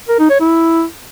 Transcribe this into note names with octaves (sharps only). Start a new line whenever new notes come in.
A#4
D#4
C#5
E4